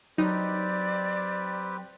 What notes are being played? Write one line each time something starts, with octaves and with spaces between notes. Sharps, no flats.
F#3 C4 D#4 G4 B4 D5